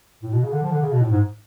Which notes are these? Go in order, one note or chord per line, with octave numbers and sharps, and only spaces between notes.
A2
B2
C#3
D3
F3
D3
C#3
B2
A2
G#2